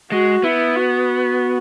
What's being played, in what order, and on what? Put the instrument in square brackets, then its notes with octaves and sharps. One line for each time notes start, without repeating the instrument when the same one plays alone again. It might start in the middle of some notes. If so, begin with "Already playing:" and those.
[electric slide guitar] G#3 [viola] F#4
[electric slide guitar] B3 [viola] E4
[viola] F#4